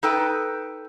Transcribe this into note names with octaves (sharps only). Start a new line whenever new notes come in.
D#4 A4 B4 G5